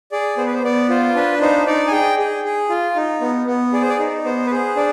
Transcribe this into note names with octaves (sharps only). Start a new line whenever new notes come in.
G#4 D5
B3 C5
B4
C5
B3 D5
F4 C5
D4 B4
D#4 C5
D#4 D5
G#5
G#4 G5
G#4
G#4
F4
D#4
B3
B3
G#4 D5
C5
D5
D#4
B3 C5
B4
G#4 C5
D4 D5